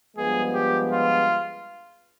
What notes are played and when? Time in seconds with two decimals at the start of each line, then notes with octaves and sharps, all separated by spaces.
0.17 G2 F3 G#3 B3 G#4
0.53 G4
0.90 F4